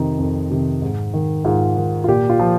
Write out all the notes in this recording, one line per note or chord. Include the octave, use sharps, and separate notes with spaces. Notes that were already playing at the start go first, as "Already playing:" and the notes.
Already playing: F2 C3 D#3 D#4
F2
C3 D#3
G#2
D#3
G#2 F4
D#3
F4
A#2 G4
F4
F3